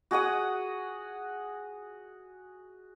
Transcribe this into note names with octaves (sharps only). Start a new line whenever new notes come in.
F#4 G#4 F#5 D#6